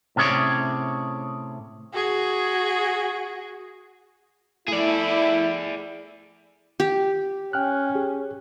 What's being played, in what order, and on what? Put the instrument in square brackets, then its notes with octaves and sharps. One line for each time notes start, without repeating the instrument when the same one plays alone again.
[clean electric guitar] A2 C3 C#4 G#4 C#5 D5
[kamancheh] F#4 G#4
[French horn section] A3 E4 [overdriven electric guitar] G#4 D5
[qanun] G4
[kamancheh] C#4 [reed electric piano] G5 F6 F#6
[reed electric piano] G4 G#4